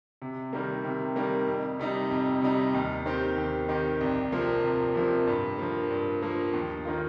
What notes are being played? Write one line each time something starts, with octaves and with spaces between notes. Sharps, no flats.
C3
D#3 G3 A#3
C3
D#3 G3 A#3
F2
C3 G3 D#4
F2
C3 G3 D#4
D#2
D#3 C4 G4
D#2
D#3 C4 G4
C2
C3 F3 A#3
C2
C3 F3 A#3
G2
F3 A#3
G2
F3 A#3
D#2
D#3 A#3 F4